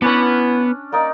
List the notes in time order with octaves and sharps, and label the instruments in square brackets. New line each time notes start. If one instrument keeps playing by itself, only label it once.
[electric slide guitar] B3 B4 [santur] C#4 D4 [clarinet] E4
[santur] A#3 D#4 [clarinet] D5